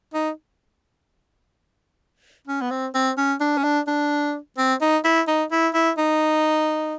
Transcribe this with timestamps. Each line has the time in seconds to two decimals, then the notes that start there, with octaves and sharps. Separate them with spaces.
0.14 D#4
2.47 C#4
2.61 B3
2.71 C4
2.95 C4
3.18 C#4
3.40 D4
3.57 C#4
3.64 D4
3.87 D4
4.58 C4
4.81 D#4
5.05 E4
5.27 D#4
5.52 E4
5.74 E4
5.98 D#4